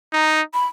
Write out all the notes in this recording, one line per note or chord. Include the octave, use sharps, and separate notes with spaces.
D#4 A#5
B5